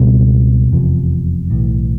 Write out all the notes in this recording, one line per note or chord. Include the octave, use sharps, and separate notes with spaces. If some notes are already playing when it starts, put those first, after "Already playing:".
Already playing: C#2 B2 G3 C4
F1 E2 C3 F3
B1 A2 E3